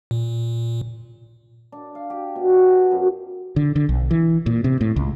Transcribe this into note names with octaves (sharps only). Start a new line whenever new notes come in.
A#2
D4
F5
G4
B2
G5
F#2
D3
D3
B1
E3
A#2
C3
A2
C#2